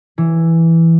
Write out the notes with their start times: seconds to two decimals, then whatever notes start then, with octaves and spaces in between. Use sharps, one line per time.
0.18 E3